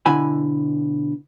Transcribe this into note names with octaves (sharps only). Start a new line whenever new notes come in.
B2 D3 E4 G#5 B5